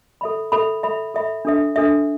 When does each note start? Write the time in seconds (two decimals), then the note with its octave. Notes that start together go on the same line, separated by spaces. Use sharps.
0.21 A4 E5 B5
0.52 A4 E5 B5
0.83 A4 E5 B5
1.14 A4 E5 B5
1.45 D4 A4 E5
1.76 D4 A4 E5